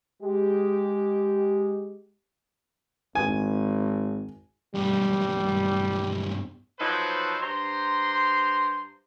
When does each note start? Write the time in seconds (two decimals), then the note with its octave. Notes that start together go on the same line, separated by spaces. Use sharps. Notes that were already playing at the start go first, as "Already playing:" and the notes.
0.23 G#3 G4
3.15 G#1 G#5
4.75 B1 G2 G3
6.79 F3 F#3 D#4 A4 B4 C5
7.42 G2 C5 A#5 C6